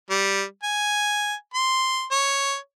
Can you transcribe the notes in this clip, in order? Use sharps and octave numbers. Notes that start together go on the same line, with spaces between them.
G3
G#5
C6
C#5